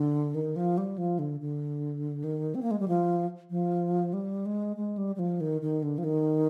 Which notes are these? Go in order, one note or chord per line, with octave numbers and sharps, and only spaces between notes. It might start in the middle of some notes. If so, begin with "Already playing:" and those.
Already playing: D3
D#3
F3
G3
F3
D3
D3
D#3
C4
A#3
G#3
G3
F3
F3
G3
G#3
G#3
G3
G3
F3
D#3
D#3
D3
F3
D#3